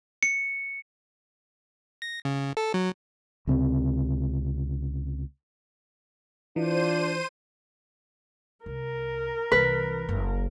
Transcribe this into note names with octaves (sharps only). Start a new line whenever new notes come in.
C#7
A#6
C#3
A4
F#3
C#2 C3 A3 C4
E3 D4 F4 C5 D#7
C2 A#4
C2 E3 B4
F#1